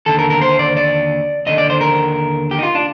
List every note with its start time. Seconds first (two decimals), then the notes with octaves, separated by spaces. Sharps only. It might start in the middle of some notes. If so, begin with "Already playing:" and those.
0.06 D#2 D3 A4
0.19 A#4
0.30 A#4
0.42 C5
0.59 D5
0.77 D5
1.46 D#2 D3 D#5
1.58 D5
1.70 C5
1.81 A#4
2.51 G4
2.59 D#4
2.63 F4
2.75 D4